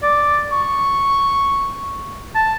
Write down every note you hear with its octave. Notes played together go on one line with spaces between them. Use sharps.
D5
C#6
A5